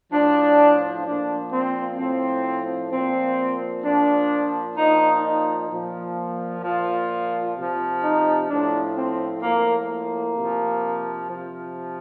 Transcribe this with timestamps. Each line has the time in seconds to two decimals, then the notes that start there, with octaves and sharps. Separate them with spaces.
0.13 A2 F3 D4
1.06 A#2 F3 D4
1.52 C4
1.99 A2 F3 C4
2.92 A#2 F3 C4
3.84 A#2 F3 D4
4.78 A#2 F3 D#4
5.25 D#4
5.70 A#2 F3
6.63 A#2 F3 F4
7.57 C3 F3
8.04 D#4
8.50 A2 F3 D4
8.96 C4
9.42 A2 F3 A#3
9.90 A#3
10.36 C3 F3
11.30 C3 F3